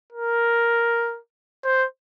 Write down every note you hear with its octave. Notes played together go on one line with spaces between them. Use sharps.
A#4
C5